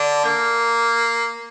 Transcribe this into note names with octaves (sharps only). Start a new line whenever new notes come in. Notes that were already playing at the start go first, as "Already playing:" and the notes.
Already playing: D3 D4
A#3